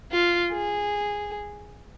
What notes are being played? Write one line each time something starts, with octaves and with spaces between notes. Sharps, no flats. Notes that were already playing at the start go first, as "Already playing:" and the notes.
F4
G#4